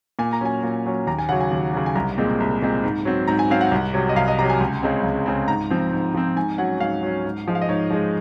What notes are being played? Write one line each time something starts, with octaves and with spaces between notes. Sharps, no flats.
A#2 G#5
A#5
F#3 C#4 G#5
A#2
F#3 C#4
D#2 A#5
G#5
C#3 F#3 F#5
G#5
D#2
C#3 F#3
G#5
C2 A#5
A#2 G#3 C4
C2
A#2 G#3 C4
G#2
F#3 C4
G#2 A#5
G#5
F#3 C4 F5
F#5
C2
C3 F#3
D#5
C2 F5
D#5
C3 F#3 A#5
G#5
C#2
C#3 G#3 C4
C#2
C#3 G#3 C4
G#2 A#5
F3 C4
G#2
F3 C4
G#2 G#5
F#3 C#4 F#5
G#2 F5
F#3 C#4
G#2
F3 G#3
F5
D#5
G#2 C#5
F3 G#3